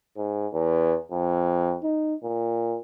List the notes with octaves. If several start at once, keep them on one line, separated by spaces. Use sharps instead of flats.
G#2
E2
F2
D#4
A#2